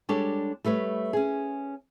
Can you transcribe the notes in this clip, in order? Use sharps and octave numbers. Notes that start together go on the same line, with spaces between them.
G3 G#3 D4 G4 A4 C#5
G3 A3 B4 C#5
C#4 G#4